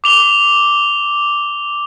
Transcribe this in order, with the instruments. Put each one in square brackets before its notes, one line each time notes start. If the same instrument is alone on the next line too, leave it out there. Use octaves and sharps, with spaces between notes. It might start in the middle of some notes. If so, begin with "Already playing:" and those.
[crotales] D6 F7 G7